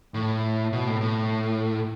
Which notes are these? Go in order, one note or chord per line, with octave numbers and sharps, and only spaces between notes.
A2
B2
A2
A2